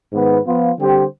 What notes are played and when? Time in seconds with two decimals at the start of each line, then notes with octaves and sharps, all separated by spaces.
0.12 G#2 D#3 B3
0.46 F3 B3 F4
0.78 D3 G3 C4 G4 C5